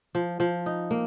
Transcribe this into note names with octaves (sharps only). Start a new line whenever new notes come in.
F3
F3
D#4
A#3